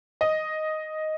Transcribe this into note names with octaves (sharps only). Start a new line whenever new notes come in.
D#5